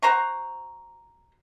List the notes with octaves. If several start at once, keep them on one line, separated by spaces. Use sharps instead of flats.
F#4 C5 A#5 C#6